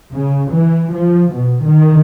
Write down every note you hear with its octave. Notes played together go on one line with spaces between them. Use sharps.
C#3
E3
F3
B2
D#3